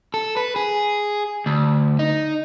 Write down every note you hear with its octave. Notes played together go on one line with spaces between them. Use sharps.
A4
B4
G#4
D2
D#4